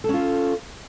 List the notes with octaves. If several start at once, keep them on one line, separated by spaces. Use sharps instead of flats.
C#4 F4 A4